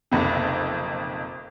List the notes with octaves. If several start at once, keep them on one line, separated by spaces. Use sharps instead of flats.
F#1 B1 F2 C3